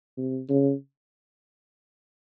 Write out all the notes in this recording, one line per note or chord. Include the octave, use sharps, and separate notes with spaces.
C3
C#3